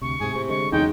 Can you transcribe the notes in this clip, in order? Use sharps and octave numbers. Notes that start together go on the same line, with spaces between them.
D2 C3 C#6
G#2 C3 G#4
A2 C3
D3 G#3 C#6
E2 C#3 F#3 G#3 D#4 G5